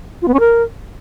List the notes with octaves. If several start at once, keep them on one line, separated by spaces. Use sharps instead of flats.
F4
B3
C#4
A#4